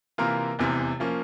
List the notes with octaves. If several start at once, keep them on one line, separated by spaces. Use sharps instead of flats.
C3 E3 A#3 F4 A#4
F1 E2 C3 E3
F3 A#3 C#4